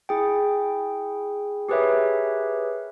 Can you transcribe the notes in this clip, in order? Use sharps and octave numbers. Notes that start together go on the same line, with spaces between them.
E4 G#4 G5
G4 G#4 A#4 B4 C#5 E5